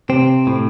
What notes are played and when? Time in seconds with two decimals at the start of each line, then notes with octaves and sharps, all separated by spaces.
0.09 C3 C4
0.47 A2